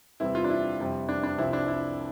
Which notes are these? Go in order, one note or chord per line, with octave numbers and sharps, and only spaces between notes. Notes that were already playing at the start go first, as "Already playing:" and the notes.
E2 C3 G3 C4 E4
F4
D4
E4
F2 C3 G3 C4
D4
D4
C2 C3 F3 C4 E4
D4
E4